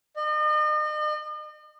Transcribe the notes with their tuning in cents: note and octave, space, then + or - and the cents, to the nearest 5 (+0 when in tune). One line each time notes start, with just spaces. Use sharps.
D#5 -40